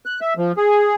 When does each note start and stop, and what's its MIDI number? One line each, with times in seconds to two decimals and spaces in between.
0.05 0.20 90
0.21 0.34 76
0.37 0.52 53
0.57 0.95 68